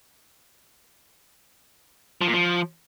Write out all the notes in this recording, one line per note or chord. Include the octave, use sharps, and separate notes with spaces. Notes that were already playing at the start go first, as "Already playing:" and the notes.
F3
A#2
F3